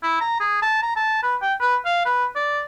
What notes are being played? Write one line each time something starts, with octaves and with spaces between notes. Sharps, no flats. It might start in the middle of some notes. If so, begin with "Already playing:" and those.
E4
A#5
G#4
A5
A#5
A5
B4
G5
B4
F5
B4
D5